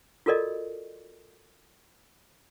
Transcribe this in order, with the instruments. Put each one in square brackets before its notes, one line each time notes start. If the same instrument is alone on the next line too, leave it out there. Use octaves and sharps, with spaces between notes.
[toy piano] F4 F#4 A4 A#4 D5 D#5